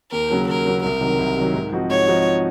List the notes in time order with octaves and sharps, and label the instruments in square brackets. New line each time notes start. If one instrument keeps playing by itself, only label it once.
[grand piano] D#2 [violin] A#4
[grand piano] C#3 F#3 A#3
[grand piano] D#2 [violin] A#4
[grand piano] C#3 F#3 A#3
[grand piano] C2 [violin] A#4
[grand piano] C3 D#3 F#3
C2
C3 D#3 F#3
G#2
F3 C4 D#4 F#4
[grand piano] G#2 [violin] C#5
[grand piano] F3 C4 D#4 F#4